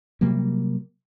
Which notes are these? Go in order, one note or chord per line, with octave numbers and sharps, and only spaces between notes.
C3 F#3 G3 A#3